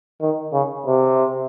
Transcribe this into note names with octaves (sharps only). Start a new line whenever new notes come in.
D#3
C#3
C3